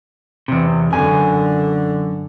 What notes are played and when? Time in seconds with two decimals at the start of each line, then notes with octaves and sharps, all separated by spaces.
0.48 E2 C3
0.93 F#2 D3 G#5